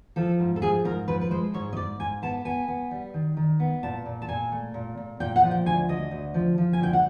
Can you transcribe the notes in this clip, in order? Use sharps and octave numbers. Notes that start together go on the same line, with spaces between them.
F3 A4
G#2
A4
F3 G#4
G#2 A#4
F3 B4
B4
G#3 C5
G#2 C#5
D#5
G#2 D5
G#2 G#5
B3 A5
B3 G#5
B3
G3
D#3
D#3
B3
A#2 A5
A#2
A5
A#2 G#5
A3
A#2
A#2
A#2 G5
F#5
F3
G5
D2 G#5
D2 D#5
D2
F3
F3
G#5
D2 G5
F#5